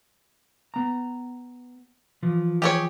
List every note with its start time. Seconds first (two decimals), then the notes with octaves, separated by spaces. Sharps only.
0.74 B3 A#5
2.23 E3 F3
2.62 G4 G#4 C#5